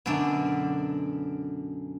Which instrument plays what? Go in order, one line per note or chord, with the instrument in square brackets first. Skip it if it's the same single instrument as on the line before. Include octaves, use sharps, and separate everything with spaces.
[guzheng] F#2 B2 D3 D4 D5 E5